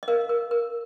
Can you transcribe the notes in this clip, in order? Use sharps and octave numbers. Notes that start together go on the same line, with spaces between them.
D#5
A#4 F5
A#4
A#4